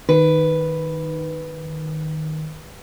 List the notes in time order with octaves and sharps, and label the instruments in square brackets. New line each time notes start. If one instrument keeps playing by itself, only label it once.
[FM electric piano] D#3 [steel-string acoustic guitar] B4